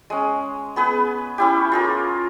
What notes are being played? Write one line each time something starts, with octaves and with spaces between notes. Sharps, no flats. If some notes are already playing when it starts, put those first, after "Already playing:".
G#3 C#4
B3 G#4 B4
C#4 E4 G4
F4 G#4 A#4